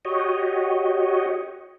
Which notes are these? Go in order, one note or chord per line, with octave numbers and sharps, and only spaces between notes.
F#4 G4 C#5 D#5